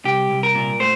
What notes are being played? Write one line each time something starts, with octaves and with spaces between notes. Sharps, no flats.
C2 G4
C2
A#4
A#2
A3 C5